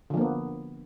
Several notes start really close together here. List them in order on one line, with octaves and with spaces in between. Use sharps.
D3 F3 A#3 B3